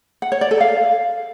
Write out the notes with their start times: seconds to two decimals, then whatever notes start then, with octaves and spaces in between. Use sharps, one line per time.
0.22 F#5
0.32 C#5
0.41 D5
0.51 A4
0.60 F5